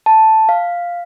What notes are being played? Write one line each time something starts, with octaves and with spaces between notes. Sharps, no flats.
A5
F5